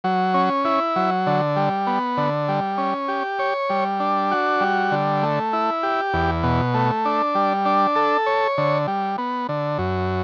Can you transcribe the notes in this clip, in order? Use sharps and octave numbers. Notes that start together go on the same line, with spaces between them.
F#3
C#4
E4
F#3
D3
G3
B3
D3
G3
C#4
G4
C#5
G3
D4
F#4
G3
D3
A3
E4
G4
E2
B2
A3
D4
G3
D4
A4
C#5
D3
G3
B3
D3
F#2